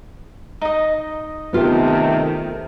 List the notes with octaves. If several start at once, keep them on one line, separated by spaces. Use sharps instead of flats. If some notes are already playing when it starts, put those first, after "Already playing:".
D#4 D#5
C3 D#3 A3 B3 F4 G4